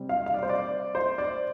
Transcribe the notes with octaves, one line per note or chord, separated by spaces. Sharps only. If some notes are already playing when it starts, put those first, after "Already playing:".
Already playing: C3 G3 C4
F5
F5
D5
C5
D5
C5
D5